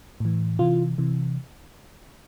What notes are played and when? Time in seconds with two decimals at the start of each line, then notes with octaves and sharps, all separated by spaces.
0.20 A2 E3
0.59 C3 E3 F4
0.98 C3 E3